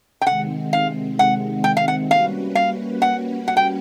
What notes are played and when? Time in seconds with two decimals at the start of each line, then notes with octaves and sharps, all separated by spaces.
0.21 G5
0.27 C3 D#3 G#3 C4 F#5
0.73 F5
1.19 F#5
1.64 G5
1.77 F5
1.88 F#5
2.10 G3 A#3 C#4 F#4 B4 F5
2.55 F5
3.02 F#5
3.48 F#5
3.57 G5